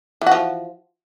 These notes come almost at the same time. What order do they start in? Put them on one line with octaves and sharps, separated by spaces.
E3 F#4 F3